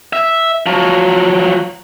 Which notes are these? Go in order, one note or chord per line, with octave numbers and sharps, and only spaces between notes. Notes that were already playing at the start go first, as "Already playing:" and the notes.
E5
F3 F#3